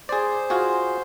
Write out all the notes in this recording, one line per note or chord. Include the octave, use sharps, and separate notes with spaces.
G#4 C5 D5
F4 F#4 G#4